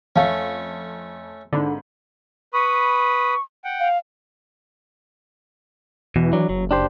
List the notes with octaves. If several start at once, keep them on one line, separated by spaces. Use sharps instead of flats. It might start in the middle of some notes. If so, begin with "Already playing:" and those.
F2 A3 C#4 E5 F5 A5
G#1 G#2 D3 B5
B4 B5 C#6 D#6
F#5 G5
F5
E2 B2 E3
F#3 D4
F#1 F#3
D4 G4 C5